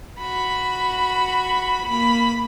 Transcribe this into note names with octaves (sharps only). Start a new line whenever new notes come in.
F#4 B5
A#3 B5